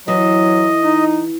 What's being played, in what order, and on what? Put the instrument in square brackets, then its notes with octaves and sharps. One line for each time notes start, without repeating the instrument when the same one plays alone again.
[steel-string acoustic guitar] E3 [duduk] F#3 [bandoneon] D#5
[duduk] D#4